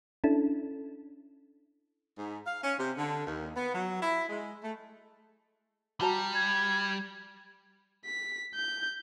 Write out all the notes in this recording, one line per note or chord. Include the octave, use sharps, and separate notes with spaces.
C#4 D4 E4 A4
G#2
F5
C#4
C3
D3
D#2
B3
F#3
E4
G#3
A3
G3 F#4 A5 A#5
G#6
B6
G6